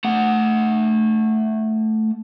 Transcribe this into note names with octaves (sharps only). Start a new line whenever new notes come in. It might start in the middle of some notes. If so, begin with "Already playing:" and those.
A3 F#5